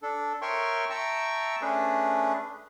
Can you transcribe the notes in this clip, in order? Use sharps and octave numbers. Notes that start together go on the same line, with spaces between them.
D4 A4
A#4 C#5 E5 G5 C6 C#6
E5 G5 A5 A#5 C#6 E6
A3 C#4 D4 G#4 B4